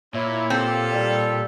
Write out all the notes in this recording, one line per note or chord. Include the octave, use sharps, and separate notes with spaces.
A#2 E4 C#5
C4 F4 G4 A4
G3